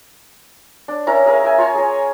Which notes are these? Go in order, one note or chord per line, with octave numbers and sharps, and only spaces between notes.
D4
C#4 E4 A#4 A#5
G#4 A#4 E5 F5
E5 G5 G#5
F4 C#5 G#5
G#4 C#5